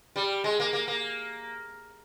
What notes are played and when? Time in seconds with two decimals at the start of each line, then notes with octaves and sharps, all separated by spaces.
0.16 G3
0.44 G#3
0.60 A#3
0.73 A#3
0.88 A#3